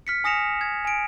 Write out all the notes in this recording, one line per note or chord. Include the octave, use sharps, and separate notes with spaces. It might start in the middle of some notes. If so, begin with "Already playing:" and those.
F6 B6 C#7
G#5 D#6 A#6 C#7 E7 F7
G#6
G#5 D7